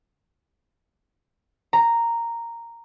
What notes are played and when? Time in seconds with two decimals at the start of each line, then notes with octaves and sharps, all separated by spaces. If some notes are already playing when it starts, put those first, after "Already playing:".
1.73 A#5